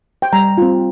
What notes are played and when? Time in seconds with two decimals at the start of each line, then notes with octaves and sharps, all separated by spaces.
0.22 G5
0.33 G3 A#5
0.58 C4 F4